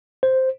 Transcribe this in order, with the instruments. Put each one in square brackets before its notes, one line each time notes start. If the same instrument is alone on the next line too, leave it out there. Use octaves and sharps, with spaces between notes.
[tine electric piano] C5